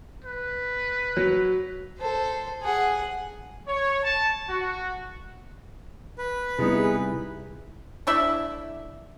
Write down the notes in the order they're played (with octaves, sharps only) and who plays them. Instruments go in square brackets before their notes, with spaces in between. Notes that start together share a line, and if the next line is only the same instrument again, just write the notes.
[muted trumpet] B4
[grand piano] F#3
[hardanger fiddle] A4 C5
G#4 F#5
[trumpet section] C#5
A5
F#4
[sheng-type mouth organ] B4
[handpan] C3 G3 [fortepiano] G#3 B3 D#4 [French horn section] E4 G#4
[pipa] A3 D4 E4 E5